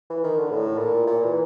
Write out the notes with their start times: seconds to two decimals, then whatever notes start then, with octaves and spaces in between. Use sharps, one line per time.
0.10 E3
0.24 D#3
0.38 D3
0.51 A2
0.79 A#2
1.07 A#2
1.25 E3